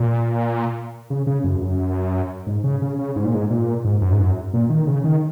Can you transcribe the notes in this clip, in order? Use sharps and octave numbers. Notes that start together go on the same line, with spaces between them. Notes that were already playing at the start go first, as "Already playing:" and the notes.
Already playing: A#2
C#3
C#3
F#2
F#2
G#2
C#3
C#3
C#3
G#2
A#2
G#2
A#2
G#2
F#2
G#2
F#2
A#2
D#3
C#3
D#3